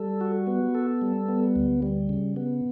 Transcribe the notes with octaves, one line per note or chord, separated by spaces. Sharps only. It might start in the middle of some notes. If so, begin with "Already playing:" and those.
Already playing: G3 A4
F#4
B3
A4
G3
B3
D2
G3
C#3
B3